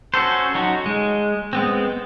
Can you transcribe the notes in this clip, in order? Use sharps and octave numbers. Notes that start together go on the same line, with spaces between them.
C#4 F#4 A4 C5
F#3 D#4 F#4
G#3
G#3 B3 C4